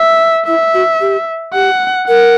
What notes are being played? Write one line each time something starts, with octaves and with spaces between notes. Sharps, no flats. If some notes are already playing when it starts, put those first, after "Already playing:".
Already playing: E5
E4 E5
F#4
G4
G4 F#5
A#4 F#5